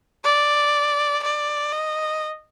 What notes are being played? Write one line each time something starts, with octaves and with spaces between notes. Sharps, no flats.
D5
D5
D#5